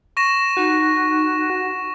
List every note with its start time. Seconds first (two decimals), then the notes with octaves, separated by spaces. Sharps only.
0.17 C#6 A#6 E7
0.57 D#4 F#4